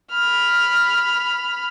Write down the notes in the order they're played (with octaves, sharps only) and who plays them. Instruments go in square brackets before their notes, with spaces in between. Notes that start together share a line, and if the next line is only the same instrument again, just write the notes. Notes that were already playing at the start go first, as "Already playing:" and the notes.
[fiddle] B5 F6